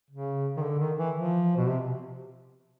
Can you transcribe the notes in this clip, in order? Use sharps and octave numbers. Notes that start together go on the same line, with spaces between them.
C#3
D#3
D3
D#3
E3
F3
B2
C3